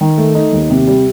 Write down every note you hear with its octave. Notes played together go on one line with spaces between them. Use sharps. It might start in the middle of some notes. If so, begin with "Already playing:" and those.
D#3
A3
D#4
D#2
C3
G3